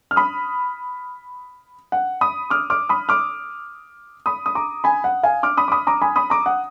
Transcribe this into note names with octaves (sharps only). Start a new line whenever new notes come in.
F6
B5 D#6
F#5
B5 D#6
D6 F6
D6 F6
B5 D#6
D6 F6
B5 D#6
D#6
A#5 D6
G#5 B5
F#5
F5 G#5
D6 F6
B5 D#6
D6
B5 D#6
A#5 D6
G#5 B5
B5 D#6
A#5 D6
F#5